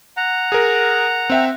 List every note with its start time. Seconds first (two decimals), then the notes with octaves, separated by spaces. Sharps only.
0.17 F#5 A#5
0.52 G#4 A#4
1.30 C4 E5 G5